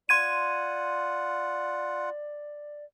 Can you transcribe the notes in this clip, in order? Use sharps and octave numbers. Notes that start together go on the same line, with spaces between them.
F4 D5 F#5 C6 G#6 D#7